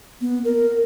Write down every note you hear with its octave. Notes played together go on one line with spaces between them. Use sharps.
B3
A#4